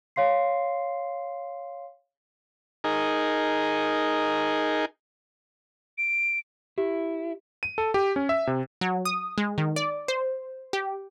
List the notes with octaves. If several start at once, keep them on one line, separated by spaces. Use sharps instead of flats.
C#5 F5 C6 C7
D#4 G#4 A#4
D7
E4 G4
D#7
A4
G4
C#4
E5
C3
F#3
D#6
G#3
D#3
D5
C5
G4